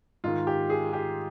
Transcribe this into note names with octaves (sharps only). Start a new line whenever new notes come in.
G#2 D#3 F4
G4
G#4
G4